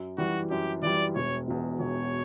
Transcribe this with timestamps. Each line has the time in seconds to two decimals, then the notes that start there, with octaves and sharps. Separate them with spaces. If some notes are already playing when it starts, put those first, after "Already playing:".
Already playing: F#2
0.18 E3 G3 F#4
0.50 F#2 G4
0.82 E3 G3 D5
1.15 E1 C#5
1.47 E2 B2
1.79 E1 C#5